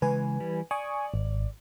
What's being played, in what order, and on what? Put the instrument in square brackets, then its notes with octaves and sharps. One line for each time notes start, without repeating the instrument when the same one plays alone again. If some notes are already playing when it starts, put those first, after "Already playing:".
[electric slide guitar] C#3 E3 G#3 [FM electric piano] B4 G#5
[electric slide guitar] E3 G3
[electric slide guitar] D5 [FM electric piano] G#5 C#6 D#6
[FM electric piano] G#1